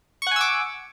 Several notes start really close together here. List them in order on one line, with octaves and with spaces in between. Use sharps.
C#6 F#5 G#5 E6 D6